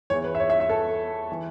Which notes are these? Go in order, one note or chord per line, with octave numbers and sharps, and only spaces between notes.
E2 E3 C#5
B4
E5
C#5
E5
E5
A4
E3